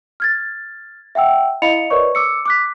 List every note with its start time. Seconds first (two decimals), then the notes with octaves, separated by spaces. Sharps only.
0.20 F6 G#6 A6
1.15 E5 F#5 G5 E6
1.62 E4 D#5 F5 B5 C#7 F7
1.90 A#4 B4 C#5 D5 C#6
2.15 D6 E6 C#7
2.46 D6 F#6 B6